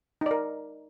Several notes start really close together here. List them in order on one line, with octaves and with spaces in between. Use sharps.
D#4 D5 A#4